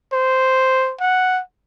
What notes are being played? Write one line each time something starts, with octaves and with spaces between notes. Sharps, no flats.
C5
F#5